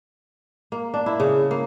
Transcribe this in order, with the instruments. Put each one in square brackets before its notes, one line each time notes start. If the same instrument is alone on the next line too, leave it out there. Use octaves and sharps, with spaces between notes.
[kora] A#3
D4
E4
C#3
A#3